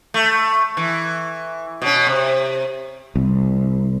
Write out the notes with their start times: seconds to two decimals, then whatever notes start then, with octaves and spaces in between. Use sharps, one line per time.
0.14 A3
0.77 E3
1.82 B2 C#4
2.07 C3
3.16 C2